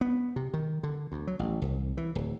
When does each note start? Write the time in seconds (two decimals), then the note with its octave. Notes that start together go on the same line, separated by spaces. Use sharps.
0.01 B3
0.36 C3
0.54 D#3
0.83 D3
1.12 D2
1.27 F#3
1.39 A1
1.62 C2
1.97 E3
2.15 D1